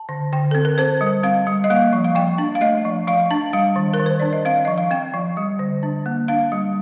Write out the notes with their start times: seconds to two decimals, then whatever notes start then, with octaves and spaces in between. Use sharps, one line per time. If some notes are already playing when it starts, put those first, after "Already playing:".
Already playing: A5
0.09 D3
0.33 D3 G5
0.51 C4 A4
0.65 A#4
0.78 C4 C5
1.01 G3
1.23 C4 F5
1.47 G3
1.64 D#5
1.70 A#3 F5
1.93 F3
2.04 F5
2.15 F3 G5
2.38 D4
2.55 F5
2.61 A3 D#5
2.85 F3
3.08 F3 F5
3.31 D4
3.53 G3 F5
3.76 D#3
3.94 A#4
3.99 D#3
4.06 C5
4.20 D4 D5
4.33 D#5
4.45 C4 F5
4.65 F3 D#5
4.78 F5
4.91 C4 G5
5.14 F3
5.37 G3
5.59 D3
5.83 D4
6.06 A#3
6.28 D4 F5
6.52 G3